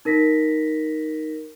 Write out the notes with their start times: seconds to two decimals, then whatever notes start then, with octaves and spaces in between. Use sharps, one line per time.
0.05 D#4 A#4 A#6 B6